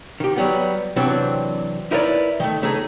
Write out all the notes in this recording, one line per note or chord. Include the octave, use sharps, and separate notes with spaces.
D#3 G4
F#3 G3 B3
C3 E3 F#3 C4 D4
D#4 E4 A#4 B4 C#5 D5
D#3 A3
C#3 A3 D#4 G#4